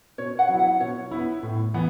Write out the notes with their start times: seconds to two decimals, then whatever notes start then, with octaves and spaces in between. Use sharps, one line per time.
0.18 B2 C#5
0.39 F#5
0.49 F#3 B3 E4
0.59 F#5
0.80 B2 C#5
1.11 B3 E4
1.43 A2
1.74 E3 B3